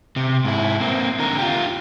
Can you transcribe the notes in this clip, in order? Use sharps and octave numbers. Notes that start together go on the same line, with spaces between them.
C3
G#2 E4
A#3 C4
D3 A#4
F4 G4